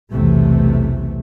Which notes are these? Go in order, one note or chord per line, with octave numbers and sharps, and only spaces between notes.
B1 E2 C3 E3 A3